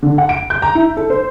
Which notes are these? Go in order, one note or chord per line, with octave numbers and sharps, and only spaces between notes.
D3
F#5
D7
G6
A#5
E4
A4
C5